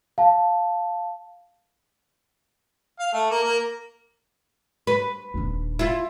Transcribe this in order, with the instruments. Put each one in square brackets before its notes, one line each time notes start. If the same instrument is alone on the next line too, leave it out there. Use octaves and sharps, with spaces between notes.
[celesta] F5 A5
[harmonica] F5
A3
A#3
A#3
[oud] B4
[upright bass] D#1 D4
[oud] E4 F4